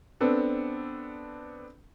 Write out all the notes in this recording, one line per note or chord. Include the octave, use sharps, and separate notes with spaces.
B3 C4 D4 A4